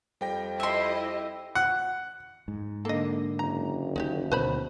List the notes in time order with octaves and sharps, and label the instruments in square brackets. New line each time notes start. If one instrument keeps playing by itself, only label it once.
[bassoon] F2 [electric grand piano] G3 G5 A#6
[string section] E4 G4 D#5 [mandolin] E5 C6
[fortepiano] F#5
[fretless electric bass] G#2
[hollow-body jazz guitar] D3 A#3 [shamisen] A4 D#5
[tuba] F#1 [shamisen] A#5
[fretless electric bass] D#2 [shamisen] D#4 F4 G4
[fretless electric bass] D2 B2 D#3 [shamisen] B4 C5 B5